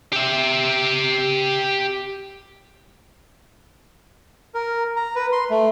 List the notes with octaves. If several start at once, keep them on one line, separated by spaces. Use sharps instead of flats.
G4 E5
A#4
A#5
B4
C6
A3